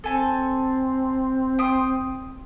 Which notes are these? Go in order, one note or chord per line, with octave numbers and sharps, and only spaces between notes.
C4 A4 G#5 A5
G5 C6 D#6